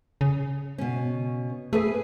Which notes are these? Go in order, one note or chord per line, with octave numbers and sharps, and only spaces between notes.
C#3
B2 C#4
A3 G#4 B4 G#5